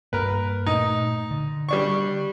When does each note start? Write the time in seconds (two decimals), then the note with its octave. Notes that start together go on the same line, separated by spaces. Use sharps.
0.13 G2 A#3 A#4 B4
0.66 A#2 A3 D#4
1.31 D3
1.69 G3 D4 C#6